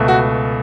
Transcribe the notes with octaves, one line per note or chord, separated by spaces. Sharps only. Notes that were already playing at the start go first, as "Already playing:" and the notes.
Already playing: C#2 B2 A3
F#4